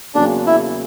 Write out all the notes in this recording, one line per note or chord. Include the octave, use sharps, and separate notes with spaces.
E2 C#3 F#3 A#3 D4
E4